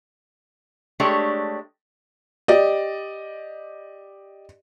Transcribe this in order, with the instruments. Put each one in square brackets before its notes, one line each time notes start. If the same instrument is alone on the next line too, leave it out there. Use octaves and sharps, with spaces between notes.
[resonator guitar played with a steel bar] G#3 A3 D4 G4 C#5
[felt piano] G4 D5 D#5